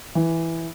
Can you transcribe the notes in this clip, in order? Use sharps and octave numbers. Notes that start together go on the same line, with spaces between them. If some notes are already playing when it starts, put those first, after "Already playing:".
E3